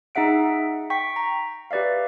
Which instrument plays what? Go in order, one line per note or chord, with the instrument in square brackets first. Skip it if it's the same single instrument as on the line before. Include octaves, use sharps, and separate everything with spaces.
[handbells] D#4 G#4 E5 F#5 D7
G5 C#6 B6
A#5
G4 B4 D5 E5 F5